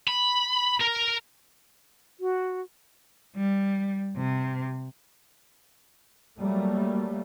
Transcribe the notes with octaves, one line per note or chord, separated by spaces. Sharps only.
B5
A#4
F#4
G3
C3
F#3 G3 A3 A#3